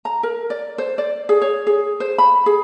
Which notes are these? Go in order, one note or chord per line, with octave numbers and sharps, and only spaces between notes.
A#5
A#4
D5
C5
D5
G#4
C#5
G#4
C5
B5
G#4